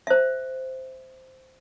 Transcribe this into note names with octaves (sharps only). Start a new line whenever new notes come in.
C5 E5